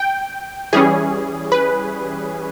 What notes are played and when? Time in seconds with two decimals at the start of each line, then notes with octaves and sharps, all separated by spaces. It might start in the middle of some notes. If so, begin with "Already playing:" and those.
Already playing: G5
0.73 E3 G3 C#4 G#4
1.52 B4